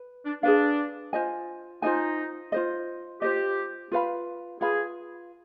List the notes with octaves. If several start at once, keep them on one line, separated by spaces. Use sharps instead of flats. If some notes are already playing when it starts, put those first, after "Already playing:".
Already playing: B4
D4
D4 G#4 B4 F5
F4 C5 D#5 G#5
D#4 F4 C5 D#5 G#5
F4 C5 D#5
F4 G4 C5 D#5
F4 B4 F5 B5
F4 G#4 B4 F5 B5